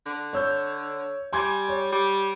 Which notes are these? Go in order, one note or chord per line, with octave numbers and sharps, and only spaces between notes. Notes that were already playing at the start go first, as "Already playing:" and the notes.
D3
C#5 E6 G6
G3 G#5 C6 G#6
C#5
G3